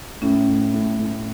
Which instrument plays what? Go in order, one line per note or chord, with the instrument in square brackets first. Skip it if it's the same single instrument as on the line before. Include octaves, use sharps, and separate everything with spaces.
[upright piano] A2 [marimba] C#4
[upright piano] A2
A2
A2